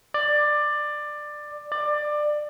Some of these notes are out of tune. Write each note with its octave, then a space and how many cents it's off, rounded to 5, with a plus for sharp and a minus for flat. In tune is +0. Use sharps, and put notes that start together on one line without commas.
D5 +15
D5 +20